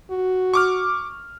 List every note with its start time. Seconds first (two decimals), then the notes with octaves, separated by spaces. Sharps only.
0.11 F#4
0.54 C#6 D6 F6